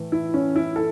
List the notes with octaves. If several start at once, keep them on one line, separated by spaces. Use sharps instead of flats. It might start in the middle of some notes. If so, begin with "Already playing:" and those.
Already playing: A2 E3
E4
C#4
E4
A4